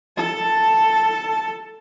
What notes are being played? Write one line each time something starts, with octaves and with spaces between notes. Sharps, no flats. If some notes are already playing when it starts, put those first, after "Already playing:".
A4 A5